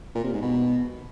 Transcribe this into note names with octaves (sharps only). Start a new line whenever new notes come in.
A#2
C3
G#2
B2